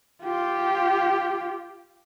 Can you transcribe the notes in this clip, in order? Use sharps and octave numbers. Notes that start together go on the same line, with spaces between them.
F4 G4